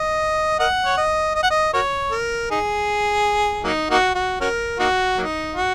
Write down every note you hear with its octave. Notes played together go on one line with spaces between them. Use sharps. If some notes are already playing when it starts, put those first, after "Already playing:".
Already playing: D#5
A#4 D#5 F#5
C#5
D#5
D#5
F#5
D#5
F#4 A#4 C#5
A#4
D#4 G#4
F#3 A#3 D#4
A#3 D#4 F#4
F#4
C#4 F#4 A#4
A#3 D#4 F#4
F#3 A#3 D#4
F#4